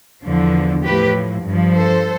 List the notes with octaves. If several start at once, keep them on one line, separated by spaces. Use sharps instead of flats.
E2 D3 F3
A2 F3 G4 B4
G2 F3
A4 C5